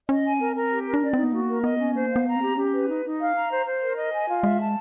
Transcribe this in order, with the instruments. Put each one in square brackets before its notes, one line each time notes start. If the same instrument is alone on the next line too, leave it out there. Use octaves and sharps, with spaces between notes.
[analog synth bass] C#4 [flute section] D#5
[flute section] G#5
[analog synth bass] C4 [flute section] A#4
[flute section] A#4
G4
A#4
[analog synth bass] D4
[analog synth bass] C#4 [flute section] D5
[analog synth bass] C4 [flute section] D#4
[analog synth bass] B3
[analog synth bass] A#3 [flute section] F#4
[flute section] A#4
[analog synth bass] B3 [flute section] D#5
[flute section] C#4
[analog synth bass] A#3 [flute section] C5
[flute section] F5
[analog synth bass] B3
[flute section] A#5
[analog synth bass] C4
[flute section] G4
[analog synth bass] C#4 [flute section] G4
[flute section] B4
D#4
D#4
F5
A#5
C5
C5
A#4
D#5
G#5
F4
[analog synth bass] G#3 [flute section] E5
[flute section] A5